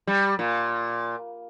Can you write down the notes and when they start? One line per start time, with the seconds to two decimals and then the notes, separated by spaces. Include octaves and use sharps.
0.07 G3
0.39 A#2